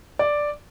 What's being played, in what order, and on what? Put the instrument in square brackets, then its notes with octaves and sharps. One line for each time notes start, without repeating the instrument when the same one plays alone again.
[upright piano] D5